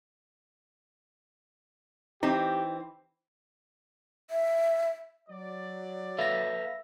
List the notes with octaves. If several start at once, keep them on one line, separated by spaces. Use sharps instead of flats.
E3 C4 D#4 G4 G5
E5
F#3 D5
A4 B4 E5 F5 A#6